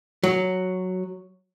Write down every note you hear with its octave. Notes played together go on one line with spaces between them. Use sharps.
F#3